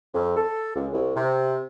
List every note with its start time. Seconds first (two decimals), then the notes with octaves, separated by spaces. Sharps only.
0.14 F2
0.36 A4
0.74 C#2
0.93 C2
1.15 C3